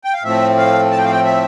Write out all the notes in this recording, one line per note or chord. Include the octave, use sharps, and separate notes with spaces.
G5
F5
A2 F3 A3 C4 E5
F5
A5
G5
F5
G5
E5